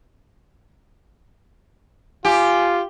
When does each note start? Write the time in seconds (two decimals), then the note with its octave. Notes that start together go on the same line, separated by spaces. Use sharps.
2.25 F4 G4 G#5